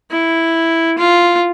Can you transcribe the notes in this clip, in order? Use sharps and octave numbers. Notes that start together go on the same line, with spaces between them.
E4
F4